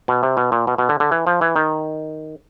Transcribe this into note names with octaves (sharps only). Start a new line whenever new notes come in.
B2
C3
B2
A#2
B2
B2
D3
D3
E3
F3
E3
D#3